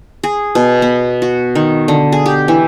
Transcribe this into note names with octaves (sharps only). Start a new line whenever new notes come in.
G#4
B2
B3
F#4
D#3
D3
G#4
G4
E3